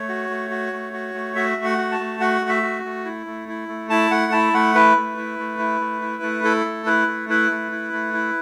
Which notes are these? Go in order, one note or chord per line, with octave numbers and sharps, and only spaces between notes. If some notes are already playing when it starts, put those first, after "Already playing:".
Already playing: A3 C#5
F#4
A3
F#4
A3
F#4
A3
F#4 E5
A3
F#5
F#4
A5
A3
F#4 F#5
A3
E5
F#4
A3
E4
A3
E4
A3
E4 A5
A3 F#5
E4 A5
A3 F#5
E4 B4
A3
E4
A3
E4
A3
E4
A3
E4 A4
A3
E4 B4
A3
E4 B4
A3
E4
A3
E4